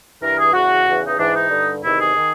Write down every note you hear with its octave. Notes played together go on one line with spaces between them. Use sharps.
G2 E3 A#4
G#4
E2 C#3 E3 F#4
E2 C#3 E3
D#4
G#2 E3 D4
D#4
G2 D3
E2 C3 D#3 E4
G#4
D#3